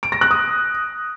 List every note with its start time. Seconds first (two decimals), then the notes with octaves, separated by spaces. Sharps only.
0.03 D7
0.12 A#6
0.21 F#6
0.31 D#6